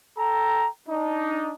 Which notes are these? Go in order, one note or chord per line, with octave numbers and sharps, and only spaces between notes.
A4 G5 A#5
D4 D#4